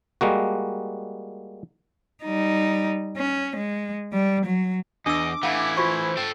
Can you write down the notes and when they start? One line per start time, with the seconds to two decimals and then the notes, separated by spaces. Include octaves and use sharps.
0.21 G3 G#3 A#3 F#4
2.23 G3 D#4
3.17 C#4
3.56 G#3
4.13 G3
4.45 F#3
5.06 E2 D4 D#5 D6 E6
5.43 E3 A3 E4 F5 F#5 G#5
5.77 F4 C5 C#6
6.17 A4 G5